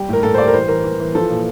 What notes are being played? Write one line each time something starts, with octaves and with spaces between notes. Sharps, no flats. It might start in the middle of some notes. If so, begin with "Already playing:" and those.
Already playing: G3 G4
A2 A#4
A2 A4
C5
G3 D5
A#4
E3 C5
E3 A#4
E3
E3
F3 A4
A#2